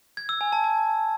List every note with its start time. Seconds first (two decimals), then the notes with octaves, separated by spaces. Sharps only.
0.17 G#6
0.29 E6
0.41 G#5
0.52 A5
0.64 A5